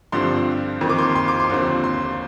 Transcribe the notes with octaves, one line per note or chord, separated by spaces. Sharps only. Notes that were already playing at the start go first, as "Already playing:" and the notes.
G2 D3 F3 C4 C6
F2 D#3 A#3
D6
C6
C6
D6
C6
D#2 D3 F3 C4
C6